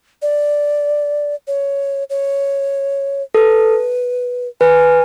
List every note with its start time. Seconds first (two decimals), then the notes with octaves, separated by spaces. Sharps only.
0.22 D5
1.47 C#5
2.10 C#5
3.34 A4 B4
4.61 B4 G#5